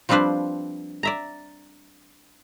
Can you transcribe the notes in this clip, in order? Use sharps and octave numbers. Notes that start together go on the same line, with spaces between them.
F3 G3 C4 D4 B4 C5
D5 E5 A#5